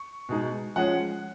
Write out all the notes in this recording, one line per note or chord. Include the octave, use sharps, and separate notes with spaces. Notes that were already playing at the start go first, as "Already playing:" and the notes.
Already playing: C#6
B2 G#3 D#4
F3 G#3 C#4 F#5